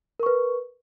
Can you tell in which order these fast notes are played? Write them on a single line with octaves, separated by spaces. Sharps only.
A#4 C#6 B4